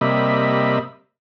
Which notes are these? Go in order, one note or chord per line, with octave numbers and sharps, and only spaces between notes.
C3 G3 A#3 D#5 E5 B5